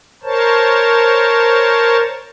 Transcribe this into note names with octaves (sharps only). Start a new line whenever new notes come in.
A#4 C5 C#5 A5